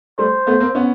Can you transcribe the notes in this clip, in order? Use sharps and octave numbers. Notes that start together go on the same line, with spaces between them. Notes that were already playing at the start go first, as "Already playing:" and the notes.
G3 A3 C5
A3 B3
A#3 C4
B3 C#4